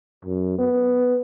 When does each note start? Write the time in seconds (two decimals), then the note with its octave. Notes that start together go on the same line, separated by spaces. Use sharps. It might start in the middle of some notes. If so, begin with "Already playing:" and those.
0.25 F#2
0.59 B3